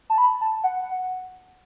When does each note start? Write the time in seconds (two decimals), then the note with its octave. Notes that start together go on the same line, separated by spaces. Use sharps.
0.10 A5
0.18 B5
0.41 A5
0.64 F#5